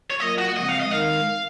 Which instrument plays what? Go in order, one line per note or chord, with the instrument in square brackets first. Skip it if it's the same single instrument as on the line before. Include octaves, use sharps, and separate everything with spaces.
[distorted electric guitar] C#5
[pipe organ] F#3 A#3 F4 A#4 [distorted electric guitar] D#5
[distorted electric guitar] F#4
[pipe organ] C#3 F3 G#3 C4 [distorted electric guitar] D#5
[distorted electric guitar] F5
D#5
[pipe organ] D#3 G#3 D#4 A#4 [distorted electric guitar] F5